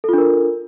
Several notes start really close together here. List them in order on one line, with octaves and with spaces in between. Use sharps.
A4 F4 D4 A#4